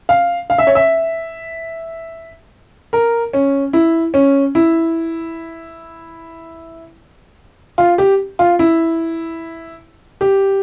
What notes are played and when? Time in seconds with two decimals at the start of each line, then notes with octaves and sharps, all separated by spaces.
0.09 F5
0.50 F5
0.58 E5
0.67 C#5
0.75 E5
2.93 A#4
3.33 C#4
3.73 E4
4.14 C#4
4.55 E4
7.78 F4
7.98 G4
8.39 F4
8.59 E4
10.21 G4